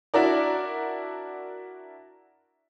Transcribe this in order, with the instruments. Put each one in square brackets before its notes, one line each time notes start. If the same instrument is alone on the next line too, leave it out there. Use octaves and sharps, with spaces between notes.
[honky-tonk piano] D4 E4 F#4 A#4 D5